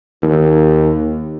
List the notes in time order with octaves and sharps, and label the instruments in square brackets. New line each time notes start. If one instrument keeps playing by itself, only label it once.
[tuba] D#2